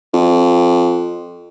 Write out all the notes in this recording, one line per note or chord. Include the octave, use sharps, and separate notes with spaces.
F2